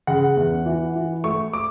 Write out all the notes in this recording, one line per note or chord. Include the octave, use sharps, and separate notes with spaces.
C#3 F#5
E2
E3
E3
A3 C#6
D6